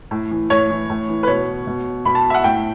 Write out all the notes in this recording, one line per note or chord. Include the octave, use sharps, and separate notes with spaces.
A2
E3
A2 C#5
E3
A2
E3
B4
B2 C#5
B2
B2 B5
A5
E5
F#5
A2 G5